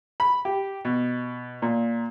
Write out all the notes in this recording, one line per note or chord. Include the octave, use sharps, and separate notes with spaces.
B5
G4
B2
A#2